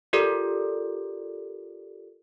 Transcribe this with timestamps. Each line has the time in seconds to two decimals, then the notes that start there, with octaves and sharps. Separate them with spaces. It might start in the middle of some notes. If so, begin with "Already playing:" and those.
0.13 F4 G4 A4 A#4 D5